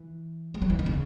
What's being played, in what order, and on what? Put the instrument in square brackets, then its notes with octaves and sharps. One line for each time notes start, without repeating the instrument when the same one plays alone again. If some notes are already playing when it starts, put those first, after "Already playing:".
Already playing: [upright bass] E3
G#3
F#3
E3
D#3
C#3